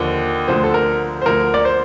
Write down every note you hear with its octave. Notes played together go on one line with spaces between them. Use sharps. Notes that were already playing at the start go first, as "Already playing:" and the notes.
Already playing: D#2 D3 F3
D2 D3 F3 C5
A4
A#4
C5
D2 D3 F3 A#4
D5
C5